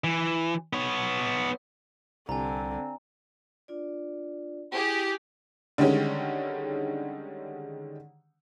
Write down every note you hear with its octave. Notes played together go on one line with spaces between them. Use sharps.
E3
B3 C#5
C2 D3 C4 G#5 A#5
D4 F4 D5
E4 G4 G#4
D3 D#3 G3 G#3 C#4